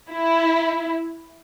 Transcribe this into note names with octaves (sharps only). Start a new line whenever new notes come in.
E4